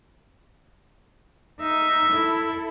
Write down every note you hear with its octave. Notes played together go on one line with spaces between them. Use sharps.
D#4 E5
E4 A4